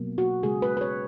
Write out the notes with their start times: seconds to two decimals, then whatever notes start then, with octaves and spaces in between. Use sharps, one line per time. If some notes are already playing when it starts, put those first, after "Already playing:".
Already playing: B2 F#3 A#3
0.18 F#4
0.43 C#3 G#3 G#4
0.62 B4
0.77 B4
0.81 C#5